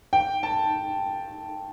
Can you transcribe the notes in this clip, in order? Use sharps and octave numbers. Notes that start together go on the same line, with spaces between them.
G5
A5